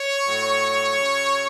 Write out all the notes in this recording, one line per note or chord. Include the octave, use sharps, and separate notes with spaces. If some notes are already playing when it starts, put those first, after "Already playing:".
Already playing: C#5
A2 F#3
C#3 F#3